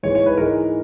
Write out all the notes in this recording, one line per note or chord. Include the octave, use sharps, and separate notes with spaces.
G#2 E3 G#3 C#5
C#5
B4
G#2 E3 G#3 A#4